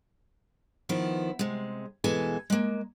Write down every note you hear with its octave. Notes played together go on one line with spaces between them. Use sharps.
D#3 F3 B3 E4
C3 G#3
E2 B2 E3 G#3 A4 G#5
G#3 A#3